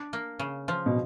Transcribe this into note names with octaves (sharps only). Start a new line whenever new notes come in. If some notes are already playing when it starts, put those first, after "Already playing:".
Already playing: D4
A#3
C#3
F3
B2